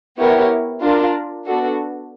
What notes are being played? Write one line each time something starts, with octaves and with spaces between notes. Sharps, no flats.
B3 E4 G4 A#4 C#5
D4 F4 A#4
B3 D4 F#4 A4